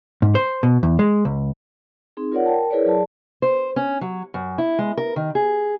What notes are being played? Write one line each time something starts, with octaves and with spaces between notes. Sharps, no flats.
G#2
C5
B2
E2
G#3
C#2
C4 D#4 G#4
F4 A#4 C#5 D5 F#5
A#4 G5 A5
E4 G#4 A#4 B4 C#5 D5
F#3 G#4 D5 A5
C5
C#4
F#3
F#2
E4
G#3
A#4
D#3
G#4